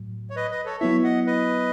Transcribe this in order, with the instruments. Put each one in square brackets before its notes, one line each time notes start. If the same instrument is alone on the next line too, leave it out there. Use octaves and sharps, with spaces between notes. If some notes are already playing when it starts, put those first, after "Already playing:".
Already playing: [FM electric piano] A2 F#3
[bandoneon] C#5
B4 D#5
B4 D#5
A4 C#5
[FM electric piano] F#3 B3 E4 [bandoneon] C#5 E5
[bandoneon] D#5 F#5
B4 D#5